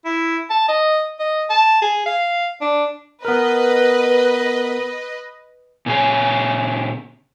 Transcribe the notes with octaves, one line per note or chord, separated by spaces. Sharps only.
E4
A5
D#5
D#5
A5
G#4
F5
D4
B3 A#4 B4 D#5
A#2 C#3 G#4